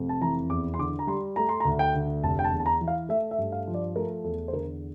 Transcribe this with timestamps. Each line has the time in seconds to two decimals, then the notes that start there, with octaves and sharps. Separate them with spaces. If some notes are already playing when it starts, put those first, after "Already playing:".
Already playing: F1 F2
0.09 A5
0.21 E3 A#5
0.50 E2 D6
0.74 C6
0.79 D3 D6
0.99 A#5
1.07 G3 C6
1.36 A3 A#5
1.49 C6
1.60 A#5
1.65 D2
1.79 G5
1.94 D3
2.23 F1 A5
2.39 G5
2.44 A5
2.51 E2
2.60 A5
2.66 A#5
2.81 E3
2.88 F5
3.09 A3 E5
3.31 E5
3.38 G2
3.52 F5
3.67 F3
3.74 D5
3.96 A3 A#4
4.24 E2 A4
4.48 C5
4.53 D3 A#4